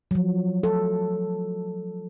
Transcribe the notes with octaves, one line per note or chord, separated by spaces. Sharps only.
F3 F#3
A4